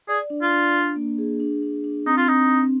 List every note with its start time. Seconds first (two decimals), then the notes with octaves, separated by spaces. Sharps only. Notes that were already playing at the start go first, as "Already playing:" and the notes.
0.08 G#4 D5
0.30 D4
0.42 F4
0.53 D4
0.74 D4
0.96 A#3
1.18 G#4
1.40 D4
1.63 D4
1.84 D4
2.06 C4 D#4
2.17 F4
2.28 C4 D#4
2.50 C4